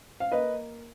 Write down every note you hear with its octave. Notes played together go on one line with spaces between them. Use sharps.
F5
A#3 B4 D#5